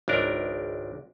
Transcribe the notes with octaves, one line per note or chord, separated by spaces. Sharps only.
G#1 C#2 D4 A#4